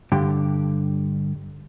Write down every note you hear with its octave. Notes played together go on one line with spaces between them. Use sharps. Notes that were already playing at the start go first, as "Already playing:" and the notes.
G2 D3 G4